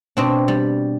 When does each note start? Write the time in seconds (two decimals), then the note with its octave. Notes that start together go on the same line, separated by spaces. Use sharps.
0.17 B2 C4 D4
0.48 G3